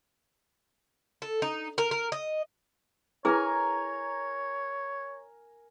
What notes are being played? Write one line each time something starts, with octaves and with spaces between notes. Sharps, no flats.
A4
D#4
A#4
A#4
D#5
E4 G#4 A#4 B4 C#5 G#5 A#5